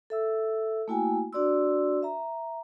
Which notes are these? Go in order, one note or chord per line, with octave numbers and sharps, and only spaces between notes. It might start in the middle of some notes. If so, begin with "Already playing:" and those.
A4 E5 E6
A3 A#3 E4 F#4 G5 G#5
D4 F#4 D5 C6 E6
E5 A#5